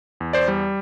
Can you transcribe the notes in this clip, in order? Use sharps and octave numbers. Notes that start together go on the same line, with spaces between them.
E2
C5 D5
G3